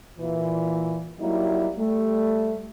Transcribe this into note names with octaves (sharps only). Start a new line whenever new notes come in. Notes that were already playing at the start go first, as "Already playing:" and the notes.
A#2 E3
F#3 G3 A#3 D#4 E4
G3 A3